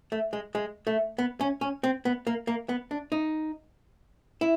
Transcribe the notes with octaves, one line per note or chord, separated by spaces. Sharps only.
A3
G#3
G#3
A3
B3
C#4
C#4
C4
B3
A#3
A#3
B3
D4
D#4
E4